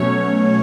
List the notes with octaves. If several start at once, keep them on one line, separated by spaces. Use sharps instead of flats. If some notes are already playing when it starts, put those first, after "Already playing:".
Already playing: B2 F#3 A3 C#4 C#5